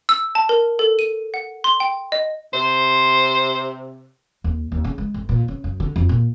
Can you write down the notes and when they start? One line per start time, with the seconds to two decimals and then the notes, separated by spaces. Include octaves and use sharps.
0.09 E6
0.35 A5
0.49 A#4
0.79 A4
0.99 D#7
1.34 F#5
1.64 C6
1.80 G5
2.12 D#5
2.54 C3 C5
4.44 D#2
4.72 D#2
4.84 C#3
4.98 G#3
5.14 G1
5.29 A#2
5.48 C#3
5.64 F#2
5.80 D3
5.96 F2
6.09 A#2